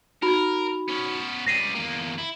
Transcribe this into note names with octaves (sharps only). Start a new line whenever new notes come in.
D#4 F#4 A#4 B5
B3 C#4
C#2 G3 A#6 C7 D#7
E2 A#3
E4